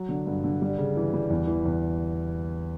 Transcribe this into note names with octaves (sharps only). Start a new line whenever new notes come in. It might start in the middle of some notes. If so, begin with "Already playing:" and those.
Already playing: F#3
D3
G2
D3
G3
C#3
E3
G3
E2
E3
E2